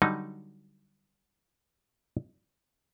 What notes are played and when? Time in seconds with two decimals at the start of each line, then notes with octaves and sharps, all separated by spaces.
0.02 D3 F#3 G3 D#4